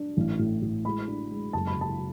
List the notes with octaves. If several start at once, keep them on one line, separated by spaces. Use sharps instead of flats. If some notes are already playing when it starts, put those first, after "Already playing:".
Already playing: D4
A1
A2
A2
G#3 B5
D4
G#3
F#1 A5
B5
F#1
A5